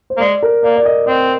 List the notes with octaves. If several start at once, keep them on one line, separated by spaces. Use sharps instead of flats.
C5
A#3
G#3 D5
A#4
A#3 D5
D5
D#5
C4 D#5